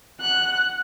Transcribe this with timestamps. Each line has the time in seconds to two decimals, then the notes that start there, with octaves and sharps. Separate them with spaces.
0.21 F#5 F#6